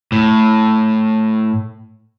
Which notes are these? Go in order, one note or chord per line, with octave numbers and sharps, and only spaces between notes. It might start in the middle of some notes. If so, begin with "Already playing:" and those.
A2